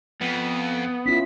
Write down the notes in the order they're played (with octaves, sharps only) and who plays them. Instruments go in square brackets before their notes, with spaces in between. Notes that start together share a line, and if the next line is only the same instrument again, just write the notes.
[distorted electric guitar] F2 [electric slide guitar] B3
[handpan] C#4 E4 F4 [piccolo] B6